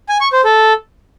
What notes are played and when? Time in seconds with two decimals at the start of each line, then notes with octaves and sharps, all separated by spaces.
0.09 G#5
0.21 C#6
0.33 C5
0.45 A4